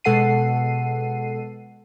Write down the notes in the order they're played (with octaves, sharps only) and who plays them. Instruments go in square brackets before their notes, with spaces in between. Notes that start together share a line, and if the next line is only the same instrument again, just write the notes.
[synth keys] B2 G#3 A4 F#5 C7 D#7